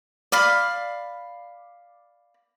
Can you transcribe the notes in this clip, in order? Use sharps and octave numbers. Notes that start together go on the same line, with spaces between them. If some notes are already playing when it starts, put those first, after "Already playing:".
D5 F5 B5